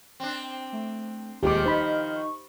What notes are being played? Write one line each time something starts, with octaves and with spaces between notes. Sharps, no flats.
C4 D4
A3
D#1 D#3 F3 G#3 G4 D6
D#4 C5 D#5 B5
C#6